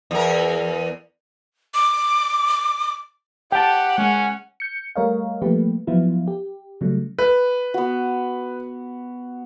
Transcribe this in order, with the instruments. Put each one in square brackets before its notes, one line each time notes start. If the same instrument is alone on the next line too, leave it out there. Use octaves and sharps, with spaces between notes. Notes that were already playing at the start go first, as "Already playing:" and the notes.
[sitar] E2 A#4
[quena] D6
[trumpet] G4 [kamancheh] F#5 [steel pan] G5 A5
[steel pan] G#3 [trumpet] C#4
[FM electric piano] G6 C#7
G3 A3 A#4 C#5 D#5 F5
F3 G3 A3 A#3 G4 B4
F3 F#3 B3 E4 F4
G4
C#3 F#3 G3 A3
[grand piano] B4
[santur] B3 F#4